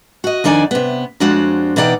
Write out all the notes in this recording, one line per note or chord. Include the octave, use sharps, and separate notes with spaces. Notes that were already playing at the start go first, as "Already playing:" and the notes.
F#4 D#5
F2 D#3 D4 D#4 D5 G#5
C3 B3
F2 G#3 D4 F#4 C5 C#5
B2 E3 D#4 D5 F#5 G5